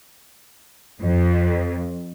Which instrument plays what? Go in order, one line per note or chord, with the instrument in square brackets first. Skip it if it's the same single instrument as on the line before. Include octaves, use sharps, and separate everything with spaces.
[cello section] F2